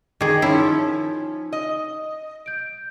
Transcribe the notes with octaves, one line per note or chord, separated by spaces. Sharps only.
D#3 G#4 D#5 D6
F3 C#4 D#4 E4
D#5
G6 D7